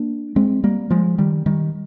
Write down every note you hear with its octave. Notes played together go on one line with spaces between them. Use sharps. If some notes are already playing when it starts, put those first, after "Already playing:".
Already playing: A#3 D4
G#3 C4
G3 A#3
F3 G#3
D#3 G3
D#3 G3